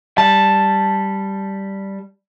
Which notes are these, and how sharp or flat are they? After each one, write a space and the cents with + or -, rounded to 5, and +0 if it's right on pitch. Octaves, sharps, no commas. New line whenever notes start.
G3 +0 A5 +0